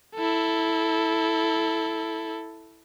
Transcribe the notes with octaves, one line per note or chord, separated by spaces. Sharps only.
E4 A4